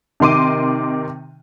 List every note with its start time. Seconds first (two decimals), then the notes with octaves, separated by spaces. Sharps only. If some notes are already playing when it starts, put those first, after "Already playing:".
0.20 C3 D#3 C6 D6 D#7